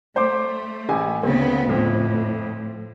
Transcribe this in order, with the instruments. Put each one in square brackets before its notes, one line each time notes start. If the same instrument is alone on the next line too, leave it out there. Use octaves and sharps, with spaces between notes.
[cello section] A3 [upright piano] C5 C6 D6
[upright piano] A1 G#5
[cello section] D2 C#3 B3 [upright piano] C4
[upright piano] F2 [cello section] A2 F3